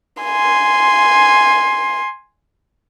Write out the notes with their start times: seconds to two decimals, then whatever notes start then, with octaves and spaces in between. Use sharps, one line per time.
0.23 G#5 C6